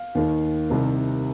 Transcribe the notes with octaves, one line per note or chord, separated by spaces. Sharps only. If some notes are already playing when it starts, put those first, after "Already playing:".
Already playing: F5
D#2 D#3
C2 C3 D#3